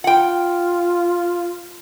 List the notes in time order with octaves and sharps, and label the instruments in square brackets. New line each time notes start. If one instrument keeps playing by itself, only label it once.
[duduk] F4 [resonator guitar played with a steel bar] F#5 G5